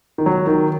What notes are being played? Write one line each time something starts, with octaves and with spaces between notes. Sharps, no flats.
D#3
F#3
D#3